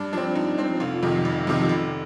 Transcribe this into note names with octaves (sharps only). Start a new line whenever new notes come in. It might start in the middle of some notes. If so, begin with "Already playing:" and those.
Already playing: G2 D4
F3 C4 D4
G2 D#4
F3 C4
F1 F4
F2 C3 D#3
F1
F2 C3 D#3
F1